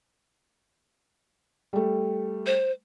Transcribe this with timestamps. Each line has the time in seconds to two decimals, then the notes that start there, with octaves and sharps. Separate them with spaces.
1.73 G3 A3
2.46 C5